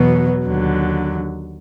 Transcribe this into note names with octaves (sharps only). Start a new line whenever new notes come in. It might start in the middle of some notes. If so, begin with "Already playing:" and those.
Already playing: E2 B2 F#3 B3
D#2 D3 F#3